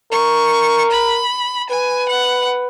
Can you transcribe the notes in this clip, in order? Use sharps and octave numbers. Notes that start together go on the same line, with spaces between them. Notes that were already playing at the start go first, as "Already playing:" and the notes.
A#4 C#6
B5
B4 G#5
F#5